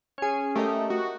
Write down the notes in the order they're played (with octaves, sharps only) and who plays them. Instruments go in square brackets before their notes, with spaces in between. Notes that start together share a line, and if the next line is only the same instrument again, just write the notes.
[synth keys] C#4 G#4
[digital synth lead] A3 [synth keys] G4 A#4 D#5
[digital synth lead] F#4